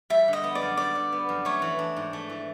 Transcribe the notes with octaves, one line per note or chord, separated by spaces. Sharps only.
G3 E5
D3
D#5
B3
D5
F#2
G3 D5
D3
B3
F#2
A3 C#5
E3
D4
G#2
A3
E3